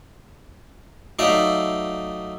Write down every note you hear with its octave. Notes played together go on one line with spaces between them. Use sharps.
F#3 A3 D#4 D5 E5 F5